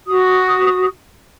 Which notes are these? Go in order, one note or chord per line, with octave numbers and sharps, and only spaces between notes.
F#4 D#6